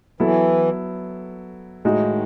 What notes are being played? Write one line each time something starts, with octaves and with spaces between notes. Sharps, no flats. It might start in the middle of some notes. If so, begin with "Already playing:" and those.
E3 F#3 B3 E4 A4
A2 D#3 G#3 D#4 F#4